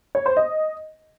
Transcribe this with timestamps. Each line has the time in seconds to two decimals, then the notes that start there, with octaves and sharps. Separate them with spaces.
0.15 C#5
0.26 C5
0.37 D#5